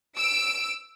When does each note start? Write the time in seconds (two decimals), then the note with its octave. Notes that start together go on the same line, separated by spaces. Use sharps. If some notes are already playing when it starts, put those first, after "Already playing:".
0.17 E6 D7